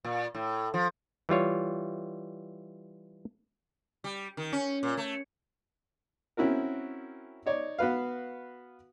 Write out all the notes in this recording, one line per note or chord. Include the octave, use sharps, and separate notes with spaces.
A#2
A2
F3
E3 G3 F4 C#5
G3
D#3
C#4
A#2
A3
C4 C#4 E4 F#4 A#4
D#4 C#5 D5
B3 F#4 B4 F5